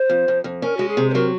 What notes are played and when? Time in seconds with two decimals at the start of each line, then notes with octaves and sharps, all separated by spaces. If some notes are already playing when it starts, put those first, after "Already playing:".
Already playing: C5
0.10 F2
0.28 F2
0.44 F2
0.62 C#4 A#4
0.77 G#3 F#4
0.88 G#4
0.97 C3
1.10 C5
1.14 F#3 A#4